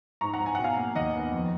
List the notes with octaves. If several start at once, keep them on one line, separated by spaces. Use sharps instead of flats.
G#2 A#5 C#6
F#5 A#5
G#2
G#5
B2 F#5
F5 G#5
A#3
D#2 D#5 F#5
B3
F2